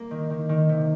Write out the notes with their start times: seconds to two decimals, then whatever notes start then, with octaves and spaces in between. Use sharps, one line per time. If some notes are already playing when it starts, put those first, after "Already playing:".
Already playing: A#3
0.11 D#3
0.30 D#3
0.49 D#3
0.69 C3